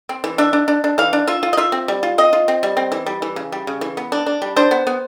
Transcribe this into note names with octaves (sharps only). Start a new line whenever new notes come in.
C4
E3
D4 E5
D4
D4
D4
E3 F5
D4
F4 E5
F4
D#5
F4 E5
C4
G3
F4
C4 D#5
F4
C4
G3
C4
E3
G3
E3
C#3
G3
C#3
E3
B3
D4
D4
G3
D4 C5
B3
B3